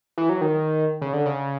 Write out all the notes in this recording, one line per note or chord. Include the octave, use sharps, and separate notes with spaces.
E3
F#3
D#3
C#3
D3
C#3